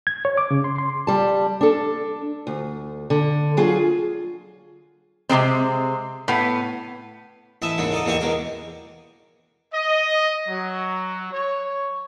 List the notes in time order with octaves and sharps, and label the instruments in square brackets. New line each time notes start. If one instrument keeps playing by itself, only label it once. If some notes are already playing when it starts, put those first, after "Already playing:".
[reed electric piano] G#6
C#5
D6
C#3
C6
C6
[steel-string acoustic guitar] G3 A5
D4 A4
D2
D3
F#3 F4 G#4
[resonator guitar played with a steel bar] C3 F#3 G#3 C4
A2 B3
[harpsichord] A1 E4 D#5 E5 A5
D#2 G#2 C#3 G#3 D4
D#4 A4 D5 D#5
E2 A#3 D4 G4 D#5 C#6
E2 B2 G#3 A#4 D6
[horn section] D#5
F#3
C#5